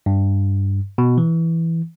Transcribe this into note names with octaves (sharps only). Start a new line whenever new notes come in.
G2
B2
E3